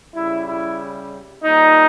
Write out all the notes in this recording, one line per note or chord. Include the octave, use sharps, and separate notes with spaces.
C#3 G3 E4
E4
A#2 G3 D#4